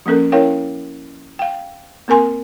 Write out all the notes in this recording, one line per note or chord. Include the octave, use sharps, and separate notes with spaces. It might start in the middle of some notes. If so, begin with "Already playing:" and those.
F3 A#3 C#4 A4 A#4
C#4 E4 A#4 C#5 F5 G5
F5 G5
A#3 C4 A#4 G#5 C6